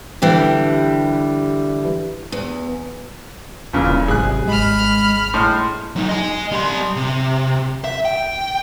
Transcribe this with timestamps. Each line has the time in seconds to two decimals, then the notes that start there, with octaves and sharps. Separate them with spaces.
0.22 D3 E3 G3 G4
2.32 E2
3.73 D#1 A#2 C#3 E3 F#3
4.08 G#1 C3 F#3 G#4 F#6
4.47 G#1 G3 G#3 B5 F6
5.34 A2 G#3 C6 F6
5.96 F#3 D#4
6.09 D#5 G#5
6.52 G3 C6
6.96 C3
7.84 E5
8.05 G5